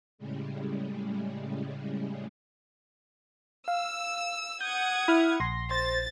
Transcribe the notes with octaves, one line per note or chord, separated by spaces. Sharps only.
A2 C#3 G3 G#3
F5 E6
F#5 D#6 G6 G#6
E4 B5 F6 F#6
A#1 C6 A#6
C5 A6